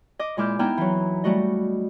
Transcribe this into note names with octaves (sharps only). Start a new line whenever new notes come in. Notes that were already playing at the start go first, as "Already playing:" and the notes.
D#5 D6
A#2 G#3 E4 D6 F6 G6
B3 D#4 E4 G5 A#5 F6
E3 F#3
G3 A3 F#4 D#5